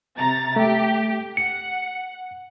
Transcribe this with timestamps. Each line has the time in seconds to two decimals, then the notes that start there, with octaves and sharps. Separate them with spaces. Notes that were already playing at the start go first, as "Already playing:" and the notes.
0.17 C3 A#5 A6
0.56 A3 G4
1.37 F#5 C#7